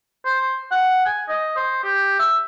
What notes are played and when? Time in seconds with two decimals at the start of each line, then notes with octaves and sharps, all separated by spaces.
0.25 C5
0.71 F#5
1.06 G#5
1.29 D#5
1.57 C5
1.83 G4
2.19 E5